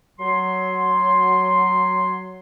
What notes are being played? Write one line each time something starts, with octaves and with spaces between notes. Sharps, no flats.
F#3 C6